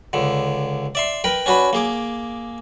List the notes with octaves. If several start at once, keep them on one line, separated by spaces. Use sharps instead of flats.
C#2 D3
D5 E5 C6
A#4 B4 G5 B5
C#4 D4 F#4 B4 B5
A#3 G#4 D6